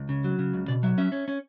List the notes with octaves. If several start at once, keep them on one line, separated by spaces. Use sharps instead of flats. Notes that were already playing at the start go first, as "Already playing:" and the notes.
Already playing: C#2
C#3
F#3
C#3
C#2
B2 D5
F#3 E5
C#4 E5
C#4
C#4